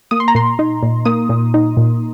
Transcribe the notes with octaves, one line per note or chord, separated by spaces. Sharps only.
A#3 D#6
C6
A#5
A#2 C6
D#4
A#2
A#3 D#6
A#2
D#4
A#2